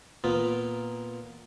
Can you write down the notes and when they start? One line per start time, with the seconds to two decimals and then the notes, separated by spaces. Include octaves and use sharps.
0.24 A#2 B3 F4